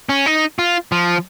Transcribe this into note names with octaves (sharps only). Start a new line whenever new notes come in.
C#4
D#4
F4
F3